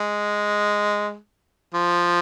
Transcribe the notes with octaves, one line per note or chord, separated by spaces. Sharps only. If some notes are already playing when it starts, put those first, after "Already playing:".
Already playing: G#3
F3